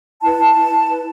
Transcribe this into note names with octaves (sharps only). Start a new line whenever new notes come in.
E4 B4 A5
E4 B4
E4 B4